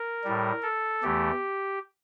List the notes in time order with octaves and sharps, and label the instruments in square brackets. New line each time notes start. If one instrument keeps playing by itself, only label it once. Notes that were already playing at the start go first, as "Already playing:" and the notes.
Already playing: [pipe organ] A#4
A2 G3
A4
E2 E3 A3 G4